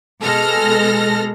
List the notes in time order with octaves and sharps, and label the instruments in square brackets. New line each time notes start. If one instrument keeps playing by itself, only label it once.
[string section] B2 G#3 A4 F6 A#6